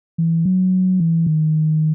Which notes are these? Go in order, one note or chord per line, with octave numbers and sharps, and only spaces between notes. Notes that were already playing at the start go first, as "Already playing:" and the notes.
E3
F#3
E3
D#3